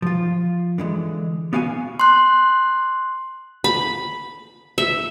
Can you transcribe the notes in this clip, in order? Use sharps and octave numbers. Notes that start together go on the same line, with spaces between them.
F3 F4
D3 E3 G#3
B3 F#4 F5 F#5 G#5
C6 F#6
B5
E5